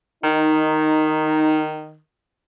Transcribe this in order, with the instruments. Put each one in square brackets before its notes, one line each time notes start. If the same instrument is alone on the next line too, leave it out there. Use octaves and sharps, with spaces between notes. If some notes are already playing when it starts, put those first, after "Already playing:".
[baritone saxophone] D#3 [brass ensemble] D#4